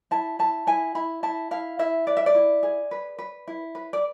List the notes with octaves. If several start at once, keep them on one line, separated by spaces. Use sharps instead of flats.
E4 A5
E4 A5
E4 G#5
E4 B5
E4 A5
E4 F5
E4 E5
B4 D5
E5
D5
E4
G#4
B4
B4
E4
B4
D5